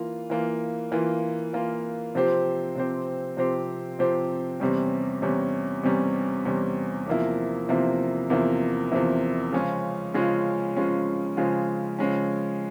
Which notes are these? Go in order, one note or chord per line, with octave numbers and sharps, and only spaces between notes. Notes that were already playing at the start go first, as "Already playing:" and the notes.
Already playing: E3 A#3 F4
E3 A#3 F4
E3 A#3 F4
E3 A#3 F4
C3 F3 C4 G4 C5
C3 F3 C4 G4 C5
C3 F3 C4 G4 C5
C3 F3 C4 G4 C5
E2 C3 G3 C#4
E2 C3 G3 C#4
E2 C3 G3 C#4
E2 C3 G3 C#4
E2 C3 F3 A#3 E4
E2 C3 F3 A#3 E4
E2 C3 F3 A#3 E4
E2 C3 F3 A#3 E4
C#3 F3 G#3 C#4 F4
C#3 F3 G#3 C#4 F4
C#3 F3 G#3 C#4 F4
C#3 F3 G#3 C#4 F4
C#3 F3 G#3 C#4